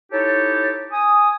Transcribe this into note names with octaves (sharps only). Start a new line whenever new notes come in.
D#4 E4 G4 A4 C#5
G#5 D#6